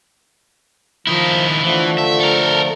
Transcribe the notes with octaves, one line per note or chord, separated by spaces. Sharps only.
D#3 F3 E4
D3 E3 F3 A3
E5
A4 A#4